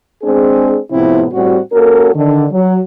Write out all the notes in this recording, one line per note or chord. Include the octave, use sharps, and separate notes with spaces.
G#3 C4 D4 G#4
A2 C3 F3 B3 C4 E4
A2 G3 C4 F#4
A#3 C#4 F#4 A4 A#4
D3 D#3
F#3